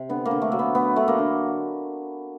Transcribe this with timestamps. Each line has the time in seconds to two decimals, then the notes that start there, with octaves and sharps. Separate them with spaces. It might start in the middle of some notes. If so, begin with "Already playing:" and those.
Already playing: C3
0.09 D3 B3
0.25 A#3
0.31 D3
0.42 A3
0.52 F#3 A#3
0.59 B3
0.75 A3 B3
0.96 D3 A3
1.08 A#3
1.19 D3